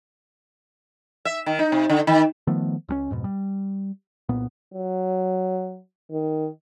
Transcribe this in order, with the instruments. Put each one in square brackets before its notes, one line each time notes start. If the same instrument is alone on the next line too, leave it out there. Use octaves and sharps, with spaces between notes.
[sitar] E5
D#3
D#4
C3
D3
D#3
[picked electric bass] D#3 F3 A3 B3
C#2 G3 C#4
F2 G#2 B2
G3
C2 A#2 B3
[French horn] F#3
D#3